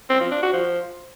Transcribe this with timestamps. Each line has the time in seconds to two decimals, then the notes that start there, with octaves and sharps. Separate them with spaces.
0.10 C4
0.20 F3
0.31 D4
0.42 F#4
0.53 F3